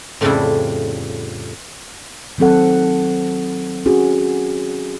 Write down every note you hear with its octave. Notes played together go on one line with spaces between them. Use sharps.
F2 A2 C#3 G3 D4 E4
D#3 F#3 C4 A4 F#5
C#4 F#4 G#4